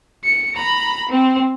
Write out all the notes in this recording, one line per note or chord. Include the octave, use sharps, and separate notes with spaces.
C#7
A#5 B5
C4